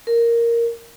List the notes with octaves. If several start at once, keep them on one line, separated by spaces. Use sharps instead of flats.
A#4